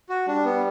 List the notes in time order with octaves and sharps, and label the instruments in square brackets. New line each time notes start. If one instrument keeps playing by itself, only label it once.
[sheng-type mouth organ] F#4
[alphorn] G3 [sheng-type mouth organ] D4
[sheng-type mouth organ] B3